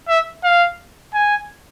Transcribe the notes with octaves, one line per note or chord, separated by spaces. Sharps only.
E5
F5
G#5